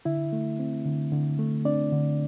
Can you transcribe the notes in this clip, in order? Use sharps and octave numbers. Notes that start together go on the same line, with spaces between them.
D3 E4 E5
A3
C4
D3
D3
A3
C4 D4 D5
D3